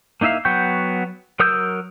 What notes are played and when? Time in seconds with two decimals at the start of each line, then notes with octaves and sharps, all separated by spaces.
0.21 A#3 D#4 E4 E5 F5
0.45 F#3 B3 G5 C#6 G6
1.40 F#3 A#4 D#6 E6 G6